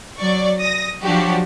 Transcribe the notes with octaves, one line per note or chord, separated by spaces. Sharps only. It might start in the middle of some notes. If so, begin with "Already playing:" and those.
F#3 D5 C#6
D#6 A#6
F3 F#3 D4 F#4 G4